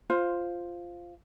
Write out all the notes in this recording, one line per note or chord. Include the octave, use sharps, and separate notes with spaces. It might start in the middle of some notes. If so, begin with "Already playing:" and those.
F4 C5 F5